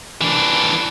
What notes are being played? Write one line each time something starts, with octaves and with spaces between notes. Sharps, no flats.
E3 D4